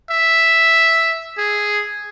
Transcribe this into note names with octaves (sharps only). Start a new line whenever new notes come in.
E5
G#4